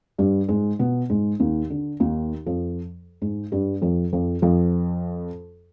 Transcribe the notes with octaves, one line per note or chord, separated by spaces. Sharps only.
G2 G3
G#2 G#3
B2 B3
G#2 G#3
D#2 D#3
D3
D#2 D#3
F2 F3
G#2 G#3
G2 G3
F2 F3
F2 F3
F2 F3